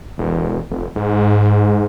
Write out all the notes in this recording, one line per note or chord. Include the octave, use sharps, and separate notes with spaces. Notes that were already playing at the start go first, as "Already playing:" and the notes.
E1
F1
G#2